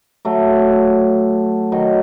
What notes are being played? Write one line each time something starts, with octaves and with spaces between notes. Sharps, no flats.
F#3 A3
D#3 F#3